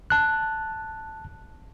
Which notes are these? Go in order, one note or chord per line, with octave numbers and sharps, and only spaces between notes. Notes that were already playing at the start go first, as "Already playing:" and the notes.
A5 F#6